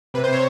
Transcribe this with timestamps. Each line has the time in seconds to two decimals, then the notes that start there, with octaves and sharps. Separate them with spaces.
0.14 C3 B4
0.24 C5
0.28 C3 C#5